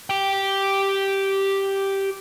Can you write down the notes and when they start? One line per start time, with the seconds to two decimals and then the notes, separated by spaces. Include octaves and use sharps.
0.10 G4 G5